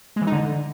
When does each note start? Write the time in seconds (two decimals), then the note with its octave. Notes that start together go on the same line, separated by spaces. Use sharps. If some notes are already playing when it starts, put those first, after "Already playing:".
0.16 G#3
0.22 E3
0.27 D#4
0.32 D3